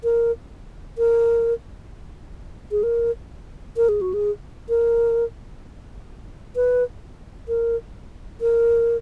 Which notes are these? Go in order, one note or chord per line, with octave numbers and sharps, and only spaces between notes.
A#4
A#4
G#4
A#4
A#4
G#4
F#4
G#4
A#4
B4
A#4
A#4